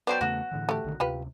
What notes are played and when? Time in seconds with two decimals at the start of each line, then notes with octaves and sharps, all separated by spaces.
0.07 F#3 B3 G4 C5 D5
0.21 E2 C#3 A3 F#4
0.51 A2 D3 E3
0.69 A3 G4
0.84 B1 D3 D#3
1.00 D2 C3 F4 G4 B4